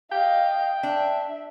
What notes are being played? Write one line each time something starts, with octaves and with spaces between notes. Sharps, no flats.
D#5 F5 G5
D4 E5